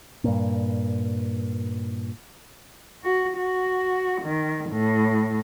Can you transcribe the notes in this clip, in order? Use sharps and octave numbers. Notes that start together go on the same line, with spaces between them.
G2 A#2
F#4
F#4
D#3
A2